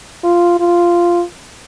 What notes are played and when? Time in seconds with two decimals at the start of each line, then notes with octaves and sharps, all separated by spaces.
0.24 F4
0.60 F4